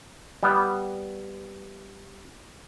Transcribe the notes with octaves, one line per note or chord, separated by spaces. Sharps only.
G3 B3